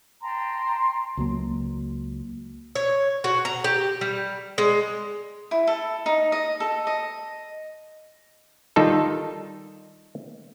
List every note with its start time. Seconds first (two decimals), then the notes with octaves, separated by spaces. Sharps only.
0.23 G5 A5 A#5 C6
1.17 C#2 F#3 A#3
2.75 C#5
3.24 F#4
3.45 A#5
3.64 G4
4.01 G3
4.58 G#3
5.51 E4
5.67 A4
6.06 D#4
6.32 D#5
6.60 A4
6.87 D#5
8.76 D#3 G3 D#4 F4 A4